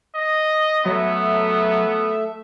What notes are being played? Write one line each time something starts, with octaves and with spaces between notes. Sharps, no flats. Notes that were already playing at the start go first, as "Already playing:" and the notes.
D#5
F#3 A3 B3 E5